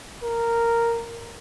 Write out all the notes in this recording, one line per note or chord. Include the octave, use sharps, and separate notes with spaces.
A#4